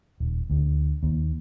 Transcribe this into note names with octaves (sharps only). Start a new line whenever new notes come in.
D#1
D2
D#2